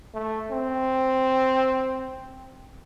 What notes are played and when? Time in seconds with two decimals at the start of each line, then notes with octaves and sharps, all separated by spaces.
0.14 A3
0.51 C4